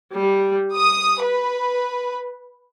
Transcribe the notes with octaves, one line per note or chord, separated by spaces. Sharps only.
G3
D#6
B4